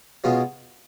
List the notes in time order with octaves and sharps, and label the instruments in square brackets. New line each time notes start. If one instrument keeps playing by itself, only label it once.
[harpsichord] B2 G#3 C#4 F4